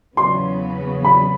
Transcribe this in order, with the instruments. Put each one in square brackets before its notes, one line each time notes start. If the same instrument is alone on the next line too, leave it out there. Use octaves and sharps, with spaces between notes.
[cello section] E2 C#3 F#3 B3 [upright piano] C6
[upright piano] B5